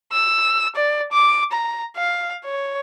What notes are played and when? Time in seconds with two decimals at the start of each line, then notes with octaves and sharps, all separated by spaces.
0.13 E6
0.75 D5
1.12 D6
1.52 A#5
1.97 F5
2.45 C#5